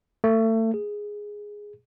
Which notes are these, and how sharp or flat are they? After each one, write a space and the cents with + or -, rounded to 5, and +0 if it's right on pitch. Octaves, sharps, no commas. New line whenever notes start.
A3 +30
G#4 -5